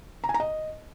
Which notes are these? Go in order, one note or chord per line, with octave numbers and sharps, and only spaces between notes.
A#5
G#5
A#5
D#5